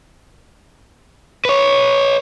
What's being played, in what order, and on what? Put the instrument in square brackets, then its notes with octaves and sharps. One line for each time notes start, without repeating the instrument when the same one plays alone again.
[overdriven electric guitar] B4 C#5